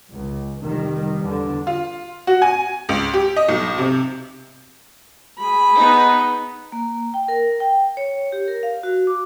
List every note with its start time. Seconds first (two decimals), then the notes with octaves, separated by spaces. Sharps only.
0.12 C#2
0.61 F1 D#3 G3
1.20 E2 D3
1.67 F4
2.27 F#4
2.42 G#5
2.89 C#2
3.13 G4
3.36 D#5
3.49 B1
3.78 C3
5.38 G#4 B5
5.78 B3 D#4
6.72 A#3
7.14 G5
7.28 A#4
7.60 G5
7.97 C#5
8.32 G4
8.48 A#4
8.63 F5
8.83 F#4
9.07 D6